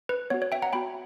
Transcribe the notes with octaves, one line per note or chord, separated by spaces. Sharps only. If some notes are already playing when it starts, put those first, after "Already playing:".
B4
B3 F#4 C#5
C#5
E5 G5
F#5 A#5
B3 F#4 G5 B5